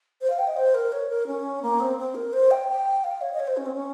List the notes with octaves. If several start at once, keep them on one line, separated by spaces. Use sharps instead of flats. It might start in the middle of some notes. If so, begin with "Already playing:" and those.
C5
F5
G5
D#5
C5
A#4
C#5
A#4
C#4
A#3
C4
C4
A#4
C5
G5
G5
F5
C#5
D#5
C#5
C5
C#4
C4
C#4